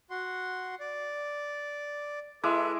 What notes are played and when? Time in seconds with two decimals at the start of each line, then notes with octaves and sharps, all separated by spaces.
0.10 F#4 F#5 C6
0.80 D5
2.43 G#3 E4 A4 B4 E5 D6